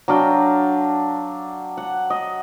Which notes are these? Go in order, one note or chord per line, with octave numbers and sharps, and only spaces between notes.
F#3 D4 F5 G5
F#5
D#5